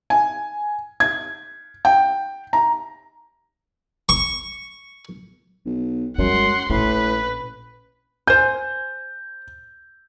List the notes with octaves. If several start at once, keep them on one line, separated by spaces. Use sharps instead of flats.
G#5
G#6
G5
A#5
C#6
B1
F#2 G3 G#3 F#5 C6
A#1 A2 C#4 B4
C5 G#5 G6